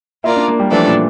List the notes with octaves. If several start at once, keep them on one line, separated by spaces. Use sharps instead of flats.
A#3 E4 F4 A#4 D5
D4
A#3
G3
E3 F3 A3 D4 A4 D5
A#2